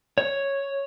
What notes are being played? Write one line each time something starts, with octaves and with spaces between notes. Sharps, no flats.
C#5